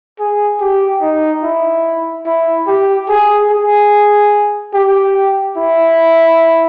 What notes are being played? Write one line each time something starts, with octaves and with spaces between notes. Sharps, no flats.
G#4
G4
D#4
E4
E4
G4
G#4
G#4
G4
E4